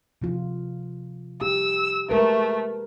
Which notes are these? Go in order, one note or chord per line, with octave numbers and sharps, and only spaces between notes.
C3 F3 F4
G4 E6
G#3 A3 A#4 B4